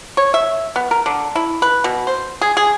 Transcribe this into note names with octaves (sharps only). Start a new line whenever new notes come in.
C#5
E5
B3
A#4
D3
E4
B4
B2
C5
G#4
G#4